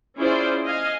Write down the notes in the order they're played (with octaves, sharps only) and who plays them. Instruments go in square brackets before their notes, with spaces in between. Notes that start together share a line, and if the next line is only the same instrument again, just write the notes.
[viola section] C#4 E4 F4 G#4 C5 D5
D#5 F5 G#5